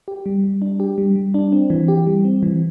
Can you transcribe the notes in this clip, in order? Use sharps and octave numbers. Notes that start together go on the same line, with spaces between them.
G4
G3
G3
D4
G4
G3
G3
D4
C4
E3
G4
G3
C4
E3